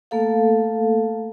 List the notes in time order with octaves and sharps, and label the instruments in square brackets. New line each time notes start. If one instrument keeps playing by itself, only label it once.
[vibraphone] A3 A#3 A4 F5